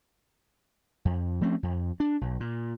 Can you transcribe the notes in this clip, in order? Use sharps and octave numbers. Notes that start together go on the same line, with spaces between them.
F2
F3 A3 C4 C#4
F2
D4
B1
A#2